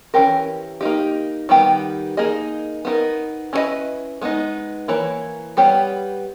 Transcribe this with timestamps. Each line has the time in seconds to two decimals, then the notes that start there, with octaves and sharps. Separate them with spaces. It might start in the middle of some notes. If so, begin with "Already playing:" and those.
0.14 E3 G3 C#4 G4 A#4
0.81 A#3 D#4 G4
1.49 D#3 G3 B3 G4
2.17 A#3 D#4 G#4 D#5
2.85 B3 D#4 A#4
3.53 C#4 E4 G#4 B4 D#5
4.21 G#3 B3 D#4
4.88 E3 A#3 C#5
5.57 G3 B3 G4 C#5